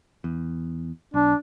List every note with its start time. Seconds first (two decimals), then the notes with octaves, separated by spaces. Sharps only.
0.24 E2
1.14 B1 D4